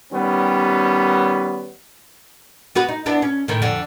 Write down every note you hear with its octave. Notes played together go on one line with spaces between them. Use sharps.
D#3 G3 B3 C#4
B3 F#4 B4
D#4
B3 D4 E4
C#4
A2 D#3
F2 D3